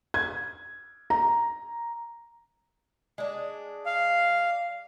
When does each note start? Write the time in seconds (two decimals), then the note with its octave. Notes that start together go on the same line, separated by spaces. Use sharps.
0.14 G#6
1.10 A#5
3.18 G#3 D4
3.86 F5